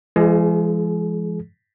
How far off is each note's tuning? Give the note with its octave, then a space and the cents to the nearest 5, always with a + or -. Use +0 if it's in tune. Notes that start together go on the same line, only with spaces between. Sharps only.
F3 -45 G#3 +0 G#4 +35